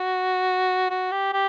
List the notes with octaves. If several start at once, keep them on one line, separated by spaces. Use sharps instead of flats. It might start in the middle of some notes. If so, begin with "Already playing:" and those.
Already playing: F#4
F#4
G4
G4